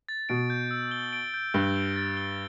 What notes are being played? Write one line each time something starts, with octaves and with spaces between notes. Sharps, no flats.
A6
B2 D7
G6
E6
G7
D7
G6
G2 G7
D7
A6
G7